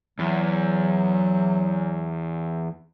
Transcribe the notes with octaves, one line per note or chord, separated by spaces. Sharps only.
E2 F#3